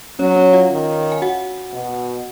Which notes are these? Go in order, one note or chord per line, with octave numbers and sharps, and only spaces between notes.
F#3 C#4 C#5
C#4 C#5
F4 F5
D#3
G#5
F#4 F#5
B2